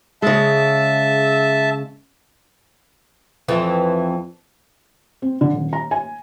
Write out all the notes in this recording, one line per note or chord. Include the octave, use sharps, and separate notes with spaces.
C#3 G#3 E5 A5
F2 E3 C4
C4
D3
D#1
A#5
G#5